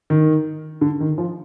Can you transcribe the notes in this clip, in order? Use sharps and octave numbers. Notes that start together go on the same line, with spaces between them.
D#3
D3
D#3
F3